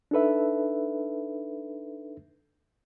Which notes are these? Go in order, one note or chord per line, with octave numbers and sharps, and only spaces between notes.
D4 D#4 A4 B4 E5